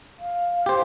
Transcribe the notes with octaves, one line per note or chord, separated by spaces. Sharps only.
F5
G4 C5